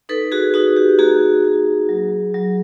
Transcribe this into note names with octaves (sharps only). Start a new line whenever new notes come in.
D#4 A4 B4
F#4 G#4
D#4 F#4
G4
A#3 F#4 G#4
F#4
F#3
F#3